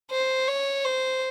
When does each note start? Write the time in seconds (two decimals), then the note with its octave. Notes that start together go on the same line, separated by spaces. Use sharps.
0.11 C5
0.48 C#5
0.85 C5